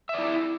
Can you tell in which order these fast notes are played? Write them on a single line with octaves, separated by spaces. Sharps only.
E5 D5 E4